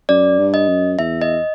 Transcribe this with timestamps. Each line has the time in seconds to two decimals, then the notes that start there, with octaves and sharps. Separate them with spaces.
0.09 F#2 D5
0.39 G2
0.54 D#5
0.69 F#2
0.99 E2 E5
1.21 D#5